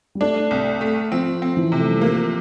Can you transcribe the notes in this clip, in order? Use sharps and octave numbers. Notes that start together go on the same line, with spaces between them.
G3
A3 D4
C2
A3
F3 C4
C4
E3
C3
A3
G3
F3 A#3